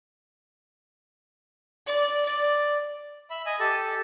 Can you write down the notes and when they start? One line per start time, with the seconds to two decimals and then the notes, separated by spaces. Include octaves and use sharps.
1.87 D5
2.25 D5
3.30 E5 B5
3.46 D#5 G#5
3.60 G4 A4 A5